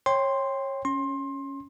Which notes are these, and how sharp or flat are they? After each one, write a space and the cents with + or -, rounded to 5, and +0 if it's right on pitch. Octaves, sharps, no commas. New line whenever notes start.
C#5 -25 G5 +10 C6 +0
C#4 +0 C6 +25